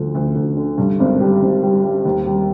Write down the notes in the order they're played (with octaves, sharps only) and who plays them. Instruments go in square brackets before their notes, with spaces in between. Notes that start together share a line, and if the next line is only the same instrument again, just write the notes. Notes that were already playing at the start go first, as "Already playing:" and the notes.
Already playing: [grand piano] D2 D3 F3
D2
D2
D3
G2
G#1
G3
G#1
G3
G3
D#2
G3